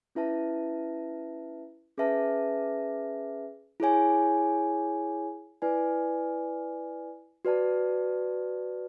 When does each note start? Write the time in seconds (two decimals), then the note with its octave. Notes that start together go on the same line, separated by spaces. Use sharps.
0.15 C#4 E4 B4 E5 A5
1.97 C#4 G#4 B4 E5 A5
3.80 E4 G#4 C#5 G#5
5.62 E4 B4 D5 G#5
7.45 F#4 B4 D5 A5